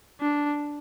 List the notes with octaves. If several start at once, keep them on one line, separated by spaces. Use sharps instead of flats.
D4